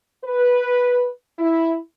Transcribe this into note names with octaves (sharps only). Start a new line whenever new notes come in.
B4
E4